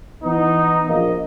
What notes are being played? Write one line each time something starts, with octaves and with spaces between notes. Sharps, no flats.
E3 B3 D#4
A#1 A#3 D#5